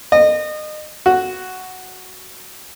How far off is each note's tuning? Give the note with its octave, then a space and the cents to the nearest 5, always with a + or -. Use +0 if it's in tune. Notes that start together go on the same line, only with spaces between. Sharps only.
D#5 -30
F#4 +0